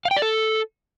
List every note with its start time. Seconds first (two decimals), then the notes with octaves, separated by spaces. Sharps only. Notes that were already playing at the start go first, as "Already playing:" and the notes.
0.05 F5
0.11 G5
0.17 D5
0.22 A4